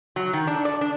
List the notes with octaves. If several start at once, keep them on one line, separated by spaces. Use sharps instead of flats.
F#3
D#3
D4
D5
D4